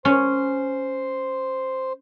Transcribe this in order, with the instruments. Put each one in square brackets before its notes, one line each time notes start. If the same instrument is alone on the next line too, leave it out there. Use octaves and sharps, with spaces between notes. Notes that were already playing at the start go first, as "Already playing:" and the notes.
[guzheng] C#4 [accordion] C5 C6